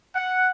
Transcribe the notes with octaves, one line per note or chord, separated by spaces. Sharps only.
F#5